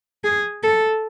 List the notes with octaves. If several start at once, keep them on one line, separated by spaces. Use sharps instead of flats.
G#4
A4